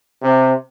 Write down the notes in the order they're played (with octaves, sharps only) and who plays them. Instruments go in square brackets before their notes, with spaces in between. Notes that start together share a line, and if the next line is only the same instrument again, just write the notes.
[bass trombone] C3